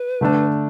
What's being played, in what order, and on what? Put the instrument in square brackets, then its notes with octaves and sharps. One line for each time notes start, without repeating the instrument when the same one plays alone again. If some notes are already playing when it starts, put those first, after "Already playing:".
Already playing: [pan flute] B4
[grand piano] D3 A3 D4